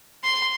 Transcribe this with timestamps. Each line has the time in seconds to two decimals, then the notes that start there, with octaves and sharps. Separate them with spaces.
0.24 C6